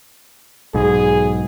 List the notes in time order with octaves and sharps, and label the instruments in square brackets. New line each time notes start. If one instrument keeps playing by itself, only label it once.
[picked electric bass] B1 G#2 [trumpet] G#4